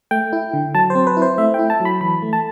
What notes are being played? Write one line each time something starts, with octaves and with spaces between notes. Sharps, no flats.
A3 G5
E4
D3
F#3 A5
C5
C4
B4
E4
C5
A3 E5
E4 G5
A5
F#3
B5
E3 B5
A3
A5